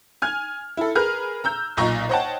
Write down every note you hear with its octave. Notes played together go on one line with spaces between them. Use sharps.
G#5 F6 G#6
E4 A4
G#4 A#4 B4 F6
A#5 E6 G6
B1 A#2 D#5 A#5 C#6
C5 C#5 D#5 F#5 G5 A5